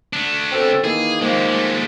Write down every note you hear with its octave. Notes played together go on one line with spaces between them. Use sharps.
A3 D4
B2 C4 A4
D#3 E3 A#3 G#4
D#3 F3 G#3 A#3 G4
G#3 A3